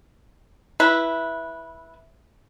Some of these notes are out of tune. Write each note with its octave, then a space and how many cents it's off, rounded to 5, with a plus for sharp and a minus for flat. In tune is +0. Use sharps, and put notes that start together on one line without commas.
E4 +0 B4 -15